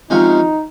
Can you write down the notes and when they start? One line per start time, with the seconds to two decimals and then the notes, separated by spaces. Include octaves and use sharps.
0.10 C3 F3 G#3 C#4 D#4 F4